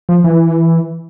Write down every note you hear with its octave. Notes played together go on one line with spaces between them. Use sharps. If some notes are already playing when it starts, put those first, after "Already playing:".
F3
E3